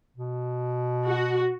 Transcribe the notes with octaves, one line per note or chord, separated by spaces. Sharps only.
B2
F#4